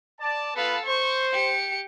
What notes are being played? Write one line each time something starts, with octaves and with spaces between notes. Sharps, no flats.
D5 A5
B3 F4 A4 B4 F5
C5 C#6
G4 C#7